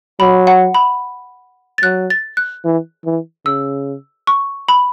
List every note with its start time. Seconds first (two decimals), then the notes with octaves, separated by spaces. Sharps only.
0.20 F#3 B5
0.47 F#5
0.74 B5
1.78 A6
1.83 F#3 F#6
2.10 A6
2.37 F#6
2.64 E3
3.06 E3
3.46 C#3 E6
4.27 C#6
4.68 B5